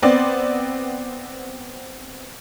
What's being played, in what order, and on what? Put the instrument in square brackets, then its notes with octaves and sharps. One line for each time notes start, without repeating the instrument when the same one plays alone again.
[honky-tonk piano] B3 C4 D5